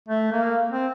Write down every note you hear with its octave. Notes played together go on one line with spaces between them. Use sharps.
A3
A#3
C4